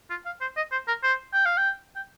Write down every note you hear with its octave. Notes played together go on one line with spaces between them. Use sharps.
F4
F5
C5
D#5
C5
A#4
C5
G5
F5
G5
G5